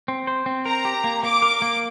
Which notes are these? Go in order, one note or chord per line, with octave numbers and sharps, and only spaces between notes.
C4
C5
C4
A#4 A#5
G4
A#3
A#3 D6
A#4
A#3